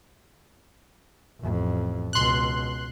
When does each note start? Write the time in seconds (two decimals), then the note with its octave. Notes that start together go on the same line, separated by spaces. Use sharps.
1.40 A1 F2
2.13 C#2 B2 C6 F#6